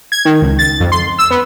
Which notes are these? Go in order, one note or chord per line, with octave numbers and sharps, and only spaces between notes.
G#6
D#3
C#2
A6
F2
C6
E6
B3